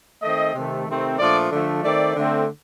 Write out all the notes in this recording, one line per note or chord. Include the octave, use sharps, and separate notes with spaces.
D#3 A3 C4 D#5
C3 D#3 A3
C3 D#3 A3 C4
A#2 F3 A3 D4 D5
D3 F3 A3
D#3 A3 C4 D5
D3 A3 C4